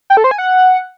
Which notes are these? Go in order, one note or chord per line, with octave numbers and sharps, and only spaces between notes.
G5
A4
C5
G#5
F#5